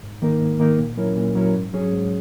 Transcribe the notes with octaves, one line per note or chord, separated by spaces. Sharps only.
G#2
D#3 A#3 D#4 A#4
G#2
D#3 A#3 D#4 A#4
A#2
F#3 C#4 E4 A#4
A#2
F#3 C#4 E4 A#4
G#2
F#3 C#4 G#4
G#2